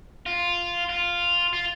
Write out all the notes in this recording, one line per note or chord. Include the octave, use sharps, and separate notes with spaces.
F4
F4
F4